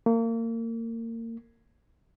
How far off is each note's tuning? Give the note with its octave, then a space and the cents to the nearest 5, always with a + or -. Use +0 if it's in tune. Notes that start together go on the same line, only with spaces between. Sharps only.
A#3 -30